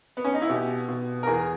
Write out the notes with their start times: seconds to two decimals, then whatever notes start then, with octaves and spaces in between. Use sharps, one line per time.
0.17 B3
0.24 C#4
0.34 D#4
0.42 E4
0.49 B2 G4
0.88 B2
1.23 A#4
1.27 E2 G#4